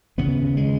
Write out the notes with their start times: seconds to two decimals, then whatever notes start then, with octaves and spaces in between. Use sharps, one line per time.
0.18 D#2 C#3 B3
0.57 G#3